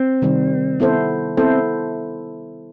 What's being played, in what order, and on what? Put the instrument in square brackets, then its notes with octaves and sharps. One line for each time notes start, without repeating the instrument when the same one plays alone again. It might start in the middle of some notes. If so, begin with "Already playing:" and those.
Already playing: [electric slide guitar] C4
[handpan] C3 D#3 G3
B3 E4 A4 C5
[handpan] B3 E4 A4 C5 [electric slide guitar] C4